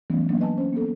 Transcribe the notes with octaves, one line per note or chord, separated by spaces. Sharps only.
E3 F#3 G3 A3 B3 C#4
F#3 A#3 B3 D4
B4 D#5 G#5 A5
C#4 C5
A#3 B3 A4